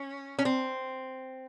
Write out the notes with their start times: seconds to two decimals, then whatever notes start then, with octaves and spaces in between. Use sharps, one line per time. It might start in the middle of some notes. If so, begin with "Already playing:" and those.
Already playing: C#4
0.39 C#4
0.45 C4